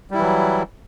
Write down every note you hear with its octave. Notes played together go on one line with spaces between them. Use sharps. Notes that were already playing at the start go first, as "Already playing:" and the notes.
E3 F#3 G3 E4